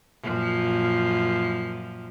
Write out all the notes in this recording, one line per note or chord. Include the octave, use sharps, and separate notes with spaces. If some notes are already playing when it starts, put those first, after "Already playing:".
F#2 A#2 F3